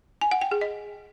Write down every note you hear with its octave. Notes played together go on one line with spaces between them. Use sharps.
G#5
F#5
G5
G#4
D#5